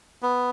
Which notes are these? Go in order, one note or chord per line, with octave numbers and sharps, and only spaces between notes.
B3